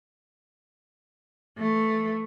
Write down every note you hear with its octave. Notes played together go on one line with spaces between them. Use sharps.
E3 A3